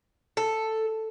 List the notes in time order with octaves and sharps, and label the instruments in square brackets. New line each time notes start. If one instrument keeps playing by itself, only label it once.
[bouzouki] A4